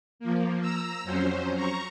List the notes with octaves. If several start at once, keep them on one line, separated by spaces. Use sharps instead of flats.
F3 A#3
A#5 E6
F2 F#3 C#4 C5
A#5 C#6